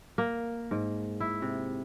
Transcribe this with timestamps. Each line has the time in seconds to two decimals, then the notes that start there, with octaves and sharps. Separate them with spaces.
0.18 A#3
0.71 G#2
1.20 E4
1.42 C3